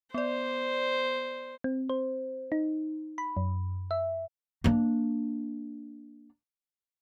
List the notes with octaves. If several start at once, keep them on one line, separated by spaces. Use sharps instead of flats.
B3 C5 D5
C4
C5
D#4
B5
F#2
E5
A#3 D4